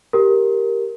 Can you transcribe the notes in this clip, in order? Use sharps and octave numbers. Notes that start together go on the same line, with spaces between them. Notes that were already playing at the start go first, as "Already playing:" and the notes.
G4 A#4